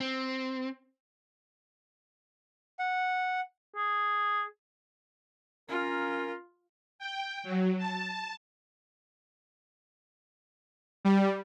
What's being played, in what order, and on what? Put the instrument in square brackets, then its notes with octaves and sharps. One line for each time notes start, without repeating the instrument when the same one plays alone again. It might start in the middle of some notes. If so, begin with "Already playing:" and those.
[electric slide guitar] C4
[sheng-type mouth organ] F#5
[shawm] G#4
[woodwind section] A#3 C#4 A#4 [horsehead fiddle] F4
[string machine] G5
F#3
A5
[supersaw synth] G3